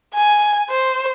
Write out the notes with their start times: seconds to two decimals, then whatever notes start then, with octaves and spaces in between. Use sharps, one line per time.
0.14 G#5
0.70 C5